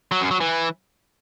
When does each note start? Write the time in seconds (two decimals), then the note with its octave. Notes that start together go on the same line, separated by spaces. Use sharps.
0.12 F#3
0.21 F#2
0.31 F#3
0.41 E3